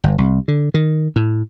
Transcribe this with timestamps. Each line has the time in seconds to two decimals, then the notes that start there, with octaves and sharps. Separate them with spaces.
0.04 G1
0.18 C2
0.48 D3
0.74 D#3
1.16 A2